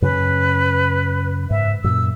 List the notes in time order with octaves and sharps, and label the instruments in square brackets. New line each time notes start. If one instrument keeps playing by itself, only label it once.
[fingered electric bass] F#2 C#3 C#4 [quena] B4
[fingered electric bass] G#2 [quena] E5
[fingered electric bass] F#2 A#2 [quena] E6